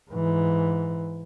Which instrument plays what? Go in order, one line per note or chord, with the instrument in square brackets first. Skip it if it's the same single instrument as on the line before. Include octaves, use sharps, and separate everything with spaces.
[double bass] G#2 E3